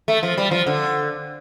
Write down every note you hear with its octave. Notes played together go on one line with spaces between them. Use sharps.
A3
F3
G3
F3
D3